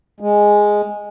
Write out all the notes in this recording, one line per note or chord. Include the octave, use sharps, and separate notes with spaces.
G#3